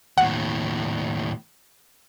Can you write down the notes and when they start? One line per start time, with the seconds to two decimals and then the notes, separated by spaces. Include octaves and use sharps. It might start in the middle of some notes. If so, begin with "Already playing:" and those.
0.18 D#2 A2 F#5